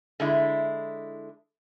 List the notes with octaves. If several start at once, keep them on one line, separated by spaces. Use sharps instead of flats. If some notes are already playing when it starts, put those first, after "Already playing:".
D3 G#3 E4